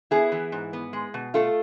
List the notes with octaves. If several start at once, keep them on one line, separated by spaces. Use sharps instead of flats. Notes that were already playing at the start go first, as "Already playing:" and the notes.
B3 E4 G#4
E3
G#2
B3
G#3
B2
A3 F4 A4